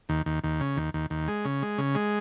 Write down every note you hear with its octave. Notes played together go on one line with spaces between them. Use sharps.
D#2
D#2
D#2
C#3
D#2
D#2
D#2
G#3
C#3
G#3
C#3
G#3